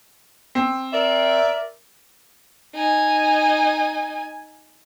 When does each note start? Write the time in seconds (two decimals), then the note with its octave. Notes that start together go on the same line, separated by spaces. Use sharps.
0.55 C4
0.93 A#4 D5 E5
2.75 D#4 G#5